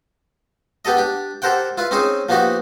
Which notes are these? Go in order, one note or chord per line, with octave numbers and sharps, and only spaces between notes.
B3 G4 A4 D#5
D4 G4
G4 A4 A#4 C5 F#5 G5
E4 F4 B4
C4 C#4 D#4 G#4 C5
F3 A#3 B3 D#4 F#4 G4